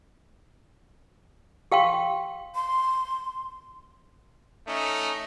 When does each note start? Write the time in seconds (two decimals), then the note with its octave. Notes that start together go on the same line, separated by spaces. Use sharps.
1.72 G4 F5 G5 C6
2.55 C6
4.66 A3 C#4 D#4